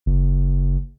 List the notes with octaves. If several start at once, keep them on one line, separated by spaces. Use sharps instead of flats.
F#1